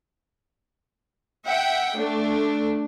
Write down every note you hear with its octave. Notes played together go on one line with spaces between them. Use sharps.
E5 F#5 G5
A3 D4